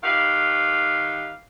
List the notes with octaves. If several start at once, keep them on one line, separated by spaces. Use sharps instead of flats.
D#3 G4 B4 F5